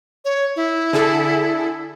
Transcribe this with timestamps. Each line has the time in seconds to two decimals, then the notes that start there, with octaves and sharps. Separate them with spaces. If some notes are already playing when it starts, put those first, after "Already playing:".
0.25 C#5
0.56 E4
0.93 D3 G#4 A4